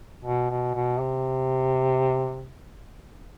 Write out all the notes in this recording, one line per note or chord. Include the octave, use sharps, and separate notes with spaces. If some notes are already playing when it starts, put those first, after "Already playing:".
B2
B2
B2
C3